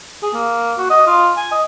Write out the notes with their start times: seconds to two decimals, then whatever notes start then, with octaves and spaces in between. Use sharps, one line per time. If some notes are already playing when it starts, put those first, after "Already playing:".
0.23 G#4
0.34 A#3
0.78 F#4
0.90 D#5
1.07 F4
1.37 G#5
1.52 D#5